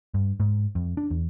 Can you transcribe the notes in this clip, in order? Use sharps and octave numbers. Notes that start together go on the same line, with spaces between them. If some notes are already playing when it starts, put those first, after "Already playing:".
G2
G#2
F2
D4
E2